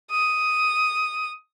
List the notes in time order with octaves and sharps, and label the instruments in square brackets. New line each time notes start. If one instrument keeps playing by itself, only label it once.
[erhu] D#6